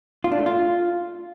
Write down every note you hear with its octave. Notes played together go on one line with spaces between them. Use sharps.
F4
D4
A3
F4